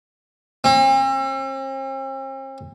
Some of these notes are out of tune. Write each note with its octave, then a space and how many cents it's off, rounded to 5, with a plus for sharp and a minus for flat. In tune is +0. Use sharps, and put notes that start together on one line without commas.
C4 +45